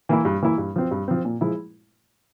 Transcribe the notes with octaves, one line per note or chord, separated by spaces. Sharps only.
E3 A#3 E4
G2
E3 A#3 E4
G2
F3 C4
G2
F3 C4
A#2
F3 G#3 E4